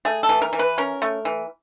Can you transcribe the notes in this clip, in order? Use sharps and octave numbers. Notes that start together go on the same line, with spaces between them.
A3 G#4
A4
E3
A#4
E3
B4
C#4 A#4
A3
E3